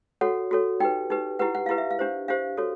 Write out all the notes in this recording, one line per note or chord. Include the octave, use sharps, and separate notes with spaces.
F#4 A4 C#5 F#5
F#4 A4 C#5
D#4 G4 B4 G5
D#4 G4 B4
E4 G4 B4 F#5
F#5
E4 G4 B4 F5
E5
F5
D4 G4 C5
D4 G4 C5 F5
F#4 A4 C#5